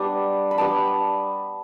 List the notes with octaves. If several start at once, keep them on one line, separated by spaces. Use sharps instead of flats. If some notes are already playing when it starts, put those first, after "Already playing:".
Already playing: G3 B3 D4 A5
B5
G3 B3 D4 A5